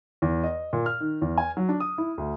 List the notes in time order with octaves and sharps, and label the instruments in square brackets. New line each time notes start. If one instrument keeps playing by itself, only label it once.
[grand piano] E2
D#5
A#2
F6
D#3
E2
G#5
F#3
D4
D#6
E4
D2